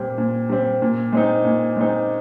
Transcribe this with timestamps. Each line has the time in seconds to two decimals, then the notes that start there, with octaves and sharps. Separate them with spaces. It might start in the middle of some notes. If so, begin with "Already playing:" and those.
Already playing: A#2 G3 C4
0.18 A#2
0.49 G3 C4
0.82 A#2
1.12 G#3 C4 D#4
1.44 A#2
1.77 G#3 C4 D#4